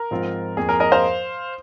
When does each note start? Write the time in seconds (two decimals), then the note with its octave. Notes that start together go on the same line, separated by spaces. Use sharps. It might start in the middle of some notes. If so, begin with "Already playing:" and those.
Already playing: A#4
0.11 G#2 F3 C4 F4
0.57 F2 F3 A#3 G#4
0.69 A#4
0.80 A#4 D#5
0.92 C5 F5